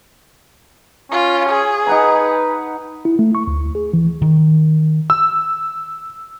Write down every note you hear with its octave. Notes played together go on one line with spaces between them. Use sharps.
C#4 F4
G#4
D#4 B4 F#5 A#5
E4
A3
C#6
D2
G#4
E3
D#3
E6